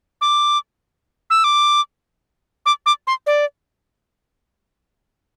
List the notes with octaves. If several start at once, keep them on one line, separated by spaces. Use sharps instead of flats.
D6
E6
D6
D6
D6
C6
D5